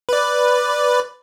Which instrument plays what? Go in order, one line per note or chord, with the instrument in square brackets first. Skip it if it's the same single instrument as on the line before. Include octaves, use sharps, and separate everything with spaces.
[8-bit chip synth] B4 D5